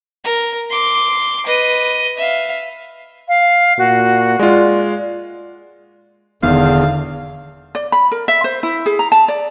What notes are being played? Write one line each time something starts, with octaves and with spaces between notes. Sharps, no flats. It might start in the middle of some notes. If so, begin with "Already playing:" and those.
A#4
C6 D6
B4 D#5
E5 F5
F5
A#2 F#4
G#3 F4 D5
E1 E2 G#2 D3 D#3 B3 E5 F5
D5
B5
A#4
E5
C5
E4
G#4
A#5
A5
D5